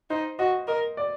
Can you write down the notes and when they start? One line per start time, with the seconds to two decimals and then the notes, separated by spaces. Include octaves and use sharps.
0.10 D#4 C5
0.39 F#4 D#5
0.68 A#4 D#5
0.97 D5